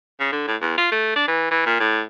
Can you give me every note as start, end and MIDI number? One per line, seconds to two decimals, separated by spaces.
0.20 0.28 49
0.32 0.48 50
0.48 0.56 45
0.61 0.75 40
0.78 0.88 65
0.92 1.15 57
1.16 1.27 62
1.28 1.49 52
1.51 1.64 52
1.66 1.79 46
1.80 2.02 45